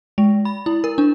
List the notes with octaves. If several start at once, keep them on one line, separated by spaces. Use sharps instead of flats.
G#3
B5
E4
A#4
D4